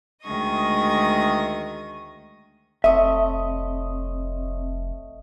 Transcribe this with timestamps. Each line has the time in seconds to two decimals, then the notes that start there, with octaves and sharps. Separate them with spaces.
0.23 D2 D#3 G#3 D#5 C#6 D#6
2.84 F1 A3 C4 C#5 D#5 E5